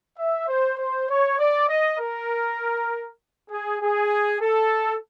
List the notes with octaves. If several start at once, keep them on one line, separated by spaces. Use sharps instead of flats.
E5
C5
C5
C#5
D5
D#5
A#4
G#4
G#4
A4